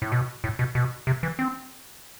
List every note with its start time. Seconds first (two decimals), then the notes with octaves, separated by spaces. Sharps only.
0.02 A2
0.12 B2
0.44 A2
0.59 B2
0.75 B2
1.07 C3
1.23 E3
1.39 C4